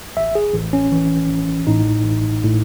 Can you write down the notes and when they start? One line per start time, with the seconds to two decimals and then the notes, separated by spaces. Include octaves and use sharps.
0.17 A1 E5
0.35 G#4
0.54 A1
0.73 C#4
0.92 E3
1.29 A1
1.67 A2 D#4
2.05 A1
2.43 A2